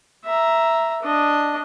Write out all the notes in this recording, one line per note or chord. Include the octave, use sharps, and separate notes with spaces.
E5 A#5
D4 D#5